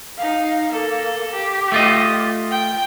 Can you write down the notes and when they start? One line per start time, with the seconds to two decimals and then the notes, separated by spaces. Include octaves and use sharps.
0.17 D#4 F5
0.70 A#3 A4
1.33 G4
1.72 A3 F4 D#5
2.51 G5